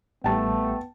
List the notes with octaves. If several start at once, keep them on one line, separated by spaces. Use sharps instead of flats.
A1 G3 A3 B3 G5 A5